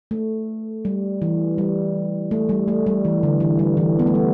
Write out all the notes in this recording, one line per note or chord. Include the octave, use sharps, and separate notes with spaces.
A3
G3
E3
G3
A3
G3
A3
G3
E3
D3
E3
G3
E3
B3
A3
G3